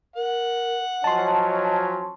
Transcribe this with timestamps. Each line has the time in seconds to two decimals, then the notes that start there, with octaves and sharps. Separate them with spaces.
0.16 A#4 F#5
1.04 F3 F#3 C#4 D#5 A5 C6